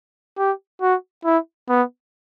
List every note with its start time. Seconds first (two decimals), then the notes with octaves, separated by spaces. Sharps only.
0.38 G4
0.82 F#4
1.25 E4
1.69 B3